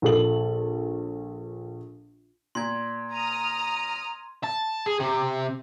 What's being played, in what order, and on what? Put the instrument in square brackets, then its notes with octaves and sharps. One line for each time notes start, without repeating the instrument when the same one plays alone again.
[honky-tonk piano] A#1 A4 F#7
[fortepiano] A#2 [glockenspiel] C6 G#6
[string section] A#5 D#6 F6
[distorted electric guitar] A5
G#4
C3